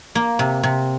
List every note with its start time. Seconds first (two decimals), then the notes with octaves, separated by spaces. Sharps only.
0.15 A#3
0.39 C3
0.63 C3